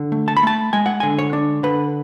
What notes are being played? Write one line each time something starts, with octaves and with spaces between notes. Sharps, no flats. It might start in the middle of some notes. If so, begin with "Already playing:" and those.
Already playing: D3
A3
A5
B5
A3 A5
G#3 G#5
F#5
D3 G#5
C#5
D4
D3 B4